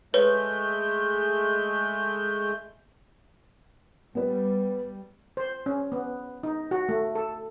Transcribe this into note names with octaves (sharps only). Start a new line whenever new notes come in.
G#3 A3 B4 C#5 G6
G3 B3 B4
C5
C#4
B3
D#4
F#4
A3
A4